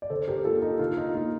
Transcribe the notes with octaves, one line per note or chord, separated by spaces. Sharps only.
D5
D3 A4 C5
G4 A#4
A#3 F4 A4
D#4 G4
D3 F4
D#4
A#3 F4